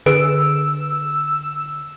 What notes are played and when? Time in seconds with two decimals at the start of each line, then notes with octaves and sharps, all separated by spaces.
0.06 D3 G#4 B4 E6 D7